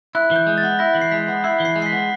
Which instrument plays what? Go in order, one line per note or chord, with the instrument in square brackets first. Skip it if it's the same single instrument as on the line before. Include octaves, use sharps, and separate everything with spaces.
[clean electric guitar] E4 [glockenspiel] F#6
[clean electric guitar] E3 [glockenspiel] G6
[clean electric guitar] G#3
[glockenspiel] A6
[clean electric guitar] B3
[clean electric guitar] E4 [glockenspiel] A#6
[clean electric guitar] E3
[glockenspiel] C7
[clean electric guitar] G#3 [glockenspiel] B6
[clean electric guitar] B3
[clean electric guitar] E4 [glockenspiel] C7
[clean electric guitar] E3
[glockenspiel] C7
[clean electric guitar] G#3
[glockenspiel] C7
B6
[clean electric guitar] B3